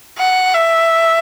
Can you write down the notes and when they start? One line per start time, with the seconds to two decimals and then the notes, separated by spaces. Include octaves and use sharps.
0.18 F#5
0.54 E5